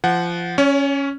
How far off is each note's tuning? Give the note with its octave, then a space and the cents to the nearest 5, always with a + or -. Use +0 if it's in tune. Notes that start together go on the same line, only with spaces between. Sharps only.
F3 -20 F#5 +0
C#4 +0 C#5 +40